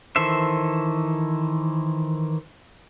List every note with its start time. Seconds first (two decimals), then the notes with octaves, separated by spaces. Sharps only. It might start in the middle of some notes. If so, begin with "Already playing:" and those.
0.16 D#3 E3 A4 C5 E5